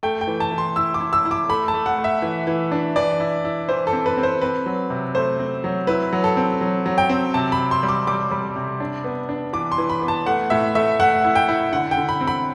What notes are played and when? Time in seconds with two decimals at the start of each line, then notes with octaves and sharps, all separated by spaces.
0.03 A3 G5
0.21 G5
0.27 E3
0.40 A5
0.52 E3
0.58 C6
0.76 E4 E6
0.94 D6
1.01 E4
1.13 E6
1.25 E4
1.31 D6
1.49 A3 B5
1.68 A5
1.74 A3
1.86 F#5
1.98 A3
2.04 E5
2.22 E3
2.47 E3
2.72 D4
2.96 E3 D5
3.20 E4
3.44 E4
3.69 E3 C5
3.87 A4
3.93 C4
4.06 B4
4.17 C4
4.23 C5
4.41 C4 B4
4.66 F#3
4.90 C3
5.15 A3 C5
5.39 C4
5.64 F#3
5.87 E4 B4
6.13 F#3
6.24 A4
6.37 C4
6.61 F#3
6.86 F#3
6.98 G5
7.09 C4
7.34 C3 A5
7.52 B5
7.58 C3
7.71 C6
7.83 G3
7.89 D6
8.07 G3 D6
8.31 G3
8.56 C3
8.80 D4
9.04 B3
9.29 D4
9.53 E3 D6
9.72 C6
9.78 E3
9.89 B5
10.02 B3
10.08 A5
10.26 A3 F#5
10.50 A2 E5
10.75 A3 E5
11.00 A3 F#5
11.24 E4
11.35 G5
11.48 E4
11.73 D3 F#5
11.91 G5
11.97 D3
12.09 B5
12.21 C4
12.27 B5